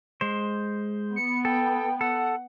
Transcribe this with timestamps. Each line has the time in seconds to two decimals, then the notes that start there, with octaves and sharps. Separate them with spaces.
0.21 G#3 C5
1.16 B3 C#7
1.45 A4 G5
2.01 A4 F#5